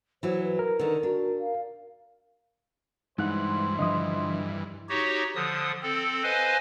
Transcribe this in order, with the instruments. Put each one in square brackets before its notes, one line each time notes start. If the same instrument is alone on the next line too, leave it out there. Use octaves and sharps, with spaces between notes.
[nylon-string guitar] E3 F#3 [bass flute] C5
[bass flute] B4
[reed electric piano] A#4
[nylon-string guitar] D3 D#3
[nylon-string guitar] D4 [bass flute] F#4
[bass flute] F5
[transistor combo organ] G2 E3 [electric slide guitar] G#3 F#5 [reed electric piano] D#4 F#6 [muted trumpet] C5
[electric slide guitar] D3 F3 [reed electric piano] D#5 E5 D#6
[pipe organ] D#4 F#4 G4 C#5
D3 F3 D#6
C4 A4
B4 C5 D#5 F5 G#5